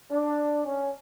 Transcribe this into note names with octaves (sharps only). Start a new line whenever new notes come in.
D4
C#4